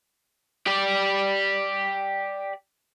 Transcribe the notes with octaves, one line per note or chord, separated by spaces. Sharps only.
G4 D5